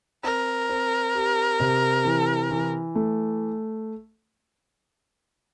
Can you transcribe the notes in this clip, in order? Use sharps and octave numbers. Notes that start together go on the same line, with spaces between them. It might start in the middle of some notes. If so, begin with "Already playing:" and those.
C4 A#4
C4
G4
C3
E3
E3
A3